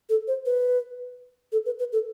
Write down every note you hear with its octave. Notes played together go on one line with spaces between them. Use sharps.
A4
C5
B4
A4
B4
B4
A4